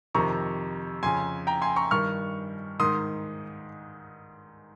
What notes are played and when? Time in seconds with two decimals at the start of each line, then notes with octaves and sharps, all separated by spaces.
0.15 F2 C3 D#3 A#5 C#6
1.03 F2 C#3 G#5 C6
1.47 G5 A#5
1.62 G#5 C6
1.76 A#5 C#6
1.91 G2 D#3 C#6 F6
2.80 G#2 D#3 C6 D#6